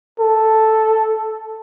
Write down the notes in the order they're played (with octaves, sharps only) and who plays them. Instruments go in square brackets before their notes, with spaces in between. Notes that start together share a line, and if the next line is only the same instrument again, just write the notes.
[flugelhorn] A4